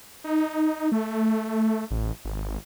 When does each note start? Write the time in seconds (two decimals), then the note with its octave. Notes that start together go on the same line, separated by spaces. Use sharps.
0.24 D#4
0.92 A3
1.91 A1
2.25 G#1